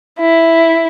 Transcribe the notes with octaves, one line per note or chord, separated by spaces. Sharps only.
E4